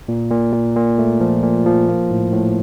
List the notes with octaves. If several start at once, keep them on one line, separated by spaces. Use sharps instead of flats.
A#2
A#2
A#2
A#2
A3
F3
A#2
F3
A#3
A2
A2